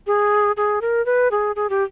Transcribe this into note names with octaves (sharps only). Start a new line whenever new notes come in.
G#4
G#4
A#4
B4
G#4
G#4
G4